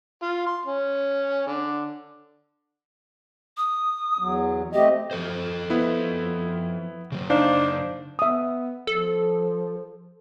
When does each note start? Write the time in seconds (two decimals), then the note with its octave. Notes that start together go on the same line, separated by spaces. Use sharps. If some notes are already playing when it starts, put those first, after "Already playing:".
0.22 F4
0.47 C6
0.66 C#4
1.47 D3
3.57 D#6
4.19 E2 F#3
4.73 A3 C4 G4 D#5
5.11 F3 A4 C5
5.70 B3 E4
7.12 C#3 F#3
7.30 D4 D#4 C5 F5
8.19 B3 E5 D#6
8.87 F3 A4